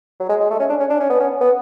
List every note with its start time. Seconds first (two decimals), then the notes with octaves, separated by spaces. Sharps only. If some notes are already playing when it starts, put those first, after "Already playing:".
0.20 F#3
0.29 G#3
0.40 G#3
0.50 A3
0.60 C#4
0.70 D4
0.80 C#4
0.90 D4
1.00 C#4
1.10 B3
1.20 C#4
1.41 B3